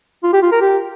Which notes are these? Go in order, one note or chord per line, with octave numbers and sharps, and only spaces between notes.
F4
G4
F4
A#4
G4